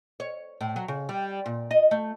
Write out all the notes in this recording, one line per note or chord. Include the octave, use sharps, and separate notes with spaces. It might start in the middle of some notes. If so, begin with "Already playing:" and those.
C#5
A2
F#3
C#3
G3
A#2
D#5
A3